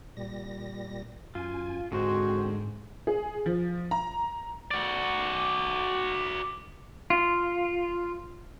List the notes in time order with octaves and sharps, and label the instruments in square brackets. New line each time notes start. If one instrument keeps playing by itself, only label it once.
[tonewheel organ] A#2 G3 A#6
[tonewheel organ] F#2 G#5 [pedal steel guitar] F4
[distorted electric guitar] G#2 [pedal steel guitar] D3 G#3 C5 [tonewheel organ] C4 [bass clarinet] F#4
[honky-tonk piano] G#4
F3
A#5
[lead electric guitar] F#4 D5
[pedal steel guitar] F4